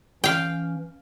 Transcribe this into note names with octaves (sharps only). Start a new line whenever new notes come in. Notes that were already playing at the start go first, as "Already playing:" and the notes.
E3 C#4 F5 G5